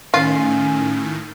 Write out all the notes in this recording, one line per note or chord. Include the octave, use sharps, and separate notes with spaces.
A2 D#3 C#4 F4